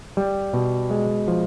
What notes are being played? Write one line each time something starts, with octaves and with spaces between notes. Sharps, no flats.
G3
B2
G#3
F3